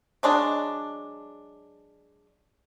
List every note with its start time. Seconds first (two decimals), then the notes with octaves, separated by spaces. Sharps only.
0.23 F#3 G#3 D4